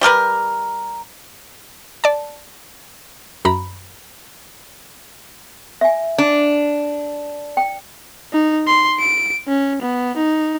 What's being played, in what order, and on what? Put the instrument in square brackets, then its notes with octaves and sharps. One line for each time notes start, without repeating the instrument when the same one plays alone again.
[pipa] G3 G4 A#4 B4
[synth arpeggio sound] D5 A5
F#2 A#5 B5
[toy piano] E5 G#5
[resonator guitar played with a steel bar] D4
[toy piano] G5
[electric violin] D#4
C6
D7
C#4
B3
D#4